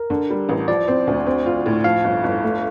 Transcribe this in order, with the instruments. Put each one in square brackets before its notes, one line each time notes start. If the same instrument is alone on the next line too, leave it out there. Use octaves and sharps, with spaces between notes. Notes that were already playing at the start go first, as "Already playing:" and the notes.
Already playing: [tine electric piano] A#4
[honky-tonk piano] D3
G3
A1
[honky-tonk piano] F3 [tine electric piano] D5
[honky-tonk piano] C4
D2
C4
F4
A2
[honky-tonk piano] F3 [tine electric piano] F5
[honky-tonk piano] G1
G1
A3